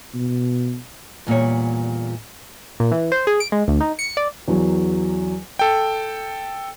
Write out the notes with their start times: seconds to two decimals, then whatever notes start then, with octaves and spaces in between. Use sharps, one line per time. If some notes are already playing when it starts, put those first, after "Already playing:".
0.14 B2
1.27 E2 A#2 G3 C#5
2.80 A#2
2.92 E3
3.12 C5
3.27 G#4
3.40 D7
3.52 G#3
3.68 D2
3.81 D#4
3.99 C#7
4.17 D5
4.48 E2 F#3
5.59 A4 G5